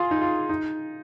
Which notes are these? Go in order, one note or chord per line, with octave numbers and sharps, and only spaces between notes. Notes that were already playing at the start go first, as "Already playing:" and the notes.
Already playing: F4 G#4
D#4
F4
D#4